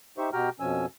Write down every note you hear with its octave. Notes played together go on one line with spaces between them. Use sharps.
D#4 G4 C5 E5 C#6
B2 F#4 G4 G5 A#5 F6
F2 B2 F3 C#4 G#5 E6